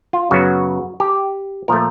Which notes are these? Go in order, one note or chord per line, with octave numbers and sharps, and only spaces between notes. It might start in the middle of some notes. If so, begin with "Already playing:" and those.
F4
F#2 C#3 F#3 B3 F#4
G4
A#2 F3 A3 A#4